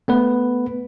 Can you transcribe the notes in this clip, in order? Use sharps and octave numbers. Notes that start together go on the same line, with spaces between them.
A3 B3 B4